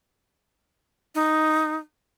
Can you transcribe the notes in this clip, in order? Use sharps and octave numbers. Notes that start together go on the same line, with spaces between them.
D#4